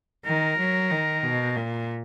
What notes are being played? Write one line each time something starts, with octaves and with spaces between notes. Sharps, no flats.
D#3 A#4
F#3
D#3
B2
A#2